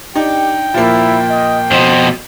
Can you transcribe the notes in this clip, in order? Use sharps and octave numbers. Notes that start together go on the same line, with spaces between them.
D4 D#4 G4 G5
A#2 F3 A#3 E4
D#5
F2 B2 C5 G6